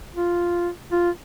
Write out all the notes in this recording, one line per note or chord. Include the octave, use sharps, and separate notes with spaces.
F4
F4